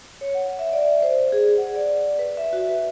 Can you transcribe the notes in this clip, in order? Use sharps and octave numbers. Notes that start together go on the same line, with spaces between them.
C#5
F#5
E5
D5
C5
G#4
F#5
D5
B4
E5
F#4
B4